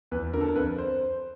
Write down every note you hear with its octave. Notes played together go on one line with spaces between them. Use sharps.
E2 B4
D3 A#4
A4
A#4
F2 B4
C5